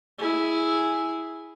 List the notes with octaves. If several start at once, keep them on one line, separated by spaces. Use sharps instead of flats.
E4 G#4